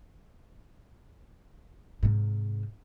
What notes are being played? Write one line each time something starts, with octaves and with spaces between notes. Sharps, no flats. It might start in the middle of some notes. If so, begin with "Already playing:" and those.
G#2 C3